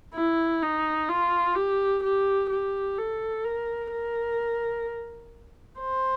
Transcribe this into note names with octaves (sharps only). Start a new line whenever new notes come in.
E4
D#4
F4
G4
G4
G4
A4
A#4
A#4
C5